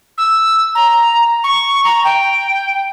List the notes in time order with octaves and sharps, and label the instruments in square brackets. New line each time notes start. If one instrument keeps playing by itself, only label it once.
[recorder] E6
A#5
C#6
A#5
G5